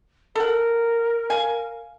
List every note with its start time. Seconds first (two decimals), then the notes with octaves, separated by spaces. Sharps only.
0.35 A4 A#4 F#5
1.30 F5 G#5